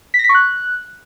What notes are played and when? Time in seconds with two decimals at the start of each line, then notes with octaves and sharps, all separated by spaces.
0.14 B6
0.19 A#6
0.24 B6
0.29 C#6
0.35 F#6